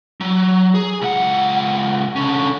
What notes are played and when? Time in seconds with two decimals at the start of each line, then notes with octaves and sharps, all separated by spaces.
0.21 F#3
0.75 G#4
1.02 C#2 F#5
2.16 D3 C#4